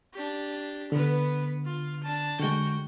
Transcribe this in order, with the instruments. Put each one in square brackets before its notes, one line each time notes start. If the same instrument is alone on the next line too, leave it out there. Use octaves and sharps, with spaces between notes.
[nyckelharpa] D4 G4
[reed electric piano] D3 [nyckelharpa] B3 B4
[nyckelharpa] F4
D4 A5
[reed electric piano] D3 G#3 [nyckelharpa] F#4 G5